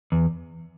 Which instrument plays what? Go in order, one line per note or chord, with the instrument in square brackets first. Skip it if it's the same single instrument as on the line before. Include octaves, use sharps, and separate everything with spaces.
[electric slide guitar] E2